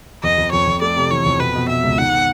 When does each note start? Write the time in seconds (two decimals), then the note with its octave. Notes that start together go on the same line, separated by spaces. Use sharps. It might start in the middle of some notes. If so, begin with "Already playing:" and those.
0.23 F2 D#5
0.38 F2
0.52 F2 C#5
0.67 F2
0.82 A3 D5
0.96 C3
1.11 E3 C#5
1.26 F2
1.40 B2 B4
1.55 B2
1.69 B2 E5
1.83 C#2
1.98 D#3 F#5
2.12 B3